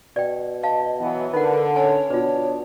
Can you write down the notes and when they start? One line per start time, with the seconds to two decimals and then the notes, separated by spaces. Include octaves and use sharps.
0.16 B2 D5 G5
0.63 D#5 F5 A5
1.00 E3 F#3 B3
1.33 D3 D#4 A#4 B4 F#5
1.76 C#4 C#5 G#5 A5
2.10 B2 D4 F4 B4